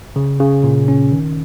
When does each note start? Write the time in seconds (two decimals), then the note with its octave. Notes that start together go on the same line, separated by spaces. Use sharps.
0.16 C#3
0.40 C#3
0.64 A#2
0.88 C#4
1.12 D#3